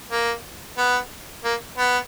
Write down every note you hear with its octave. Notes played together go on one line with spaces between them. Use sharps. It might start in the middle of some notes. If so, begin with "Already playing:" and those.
A#3
B3
A#3
B3